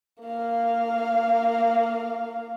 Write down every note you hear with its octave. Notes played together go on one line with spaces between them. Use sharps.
A#3 F5